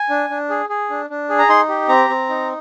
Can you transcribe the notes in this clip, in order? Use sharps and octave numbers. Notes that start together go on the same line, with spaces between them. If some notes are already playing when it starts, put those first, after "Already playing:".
Already playing: G#5
D4
D4
G#4
G#4
D4
D4
G#4
A#5
D#4 C6
G4
C4 A#5
C4
D#4